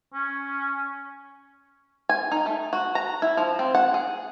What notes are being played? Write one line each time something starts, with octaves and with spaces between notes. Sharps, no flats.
C#4
G#5
D#4
A3
F#4
A#5
E4
F3
C4
F#5
G#4